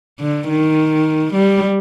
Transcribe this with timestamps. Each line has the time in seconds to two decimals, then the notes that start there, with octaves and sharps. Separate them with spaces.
0.20 D3
0.49 D#3
1.34 G3